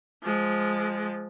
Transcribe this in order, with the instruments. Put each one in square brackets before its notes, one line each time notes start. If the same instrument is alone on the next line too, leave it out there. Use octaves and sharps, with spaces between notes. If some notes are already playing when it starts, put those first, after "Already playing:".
[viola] F3 G#3